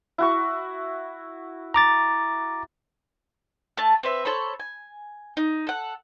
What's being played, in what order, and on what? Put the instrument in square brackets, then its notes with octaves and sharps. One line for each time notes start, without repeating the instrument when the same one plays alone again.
[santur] E4 F#4 C#6
[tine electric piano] A#5 D6 A6
[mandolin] A3 A5
C4 B4 E5
A4 C5 C#5 B5
G#5
D#4
A4 F#5